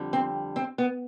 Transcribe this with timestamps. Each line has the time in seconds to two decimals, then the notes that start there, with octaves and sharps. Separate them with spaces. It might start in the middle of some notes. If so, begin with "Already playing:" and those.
Already playing: F2 D3 G3
0.13 C4
0.56 C4
0.78 B3